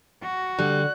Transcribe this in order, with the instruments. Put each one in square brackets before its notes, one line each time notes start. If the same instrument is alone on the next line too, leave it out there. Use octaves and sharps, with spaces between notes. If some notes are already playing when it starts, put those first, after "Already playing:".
[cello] F#4
[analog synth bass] D3 [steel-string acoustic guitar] G3 [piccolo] F#6